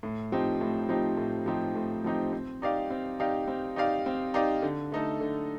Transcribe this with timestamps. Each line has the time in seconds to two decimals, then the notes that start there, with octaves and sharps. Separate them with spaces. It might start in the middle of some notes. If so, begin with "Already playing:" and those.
0.03 A2
0.32 F3 C4 D#4 G4
0.61 A2
0.89 F3 C4 D#4 G4
1.17 A2
1.46 F3 C4 D#4 G4
1.75 A2
2.04 F3 C4 D#4 G4
2.32 C4
2.62 D#4 G4 D5 F5
2.90 C4
3.20 D#4 G4 D5 F5
3.48 C4
3.76 D#4 G4 D5 F5
4.06 C4
4.34 D#4 G4 D5 F5
4.62 D3
4.92 A3 D#4 A4
5.21 D3